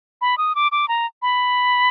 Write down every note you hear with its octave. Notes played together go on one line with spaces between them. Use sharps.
B5
D#6
D6
D6
A#5
B5